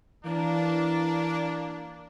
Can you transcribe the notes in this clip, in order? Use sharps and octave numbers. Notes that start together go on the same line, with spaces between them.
E3 A#3 D4